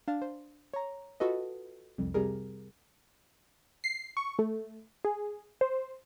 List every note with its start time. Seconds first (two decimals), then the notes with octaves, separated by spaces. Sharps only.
0.08 D4 F5 A5
0.22 C5
0.74 C#5 A#5
1.20 F4 F#4 A4 B4 D#5
1.98 C2 F2
2.14 C3 G3 G#4 A#4
3.84 C7
4.17 C#6
4.39 A3
5.05 G#4
5.61 C5